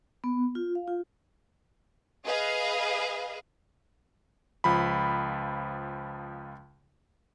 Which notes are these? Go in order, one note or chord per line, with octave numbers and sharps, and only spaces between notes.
B3
F4
F5
F4
G#4 B4 D#5 F5
C#2 F3 B5